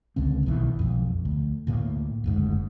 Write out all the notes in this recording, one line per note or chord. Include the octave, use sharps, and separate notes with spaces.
C#2 D3 C4
B1 B2 D#3 E3
B1 F2
D2
D2 A2 A3 A#3
F#1 D2 G#2